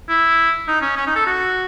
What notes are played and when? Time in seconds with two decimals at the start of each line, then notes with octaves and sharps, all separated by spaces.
0.09 E4
0.68 D#4
0.81 C#4
0.96 C#4
1.07 D#4
1.16 A4
1.26 F#4